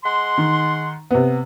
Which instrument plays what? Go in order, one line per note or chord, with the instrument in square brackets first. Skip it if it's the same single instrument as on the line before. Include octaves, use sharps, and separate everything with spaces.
[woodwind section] G#3 F#5 C6
[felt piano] D#3
C3 B3